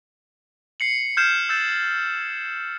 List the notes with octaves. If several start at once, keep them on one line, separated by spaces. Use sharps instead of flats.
C7 C#7 F#7
F6 G6 G#6 C7 E7
E6 G6 A6 E7